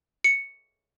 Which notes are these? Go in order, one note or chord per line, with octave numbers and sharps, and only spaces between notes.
C#7